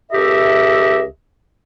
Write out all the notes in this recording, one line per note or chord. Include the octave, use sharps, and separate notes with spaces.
C#2 G4 A4 D#5 E5